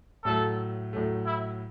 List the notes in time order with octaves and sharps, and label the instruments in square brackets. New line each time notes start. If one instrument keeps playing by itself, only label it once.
[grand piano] A2 F#3 A3 [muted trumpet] A4
[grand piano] A2 F#3 A3
[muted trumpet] E4